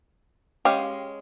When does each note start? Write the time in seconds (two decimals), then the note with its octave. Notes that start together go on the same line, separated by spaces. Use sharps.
0.65 G#3 C#4 G4 F5